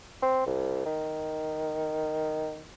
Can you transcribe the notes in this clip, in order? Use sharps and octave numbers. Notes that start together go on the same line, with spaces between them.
C4
C2
D#3